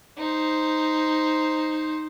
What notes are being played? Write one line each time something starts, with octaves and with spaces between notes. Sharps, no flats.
D#4 C5